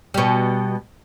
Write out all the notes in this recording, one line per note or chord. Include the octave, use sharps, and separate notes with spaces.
B2 G3